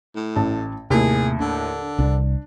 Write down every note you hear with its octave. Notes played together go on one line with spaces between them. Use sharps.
A2
A1 A5
D#2 A2 C3 E4 G#4
D3 D4
C2 D4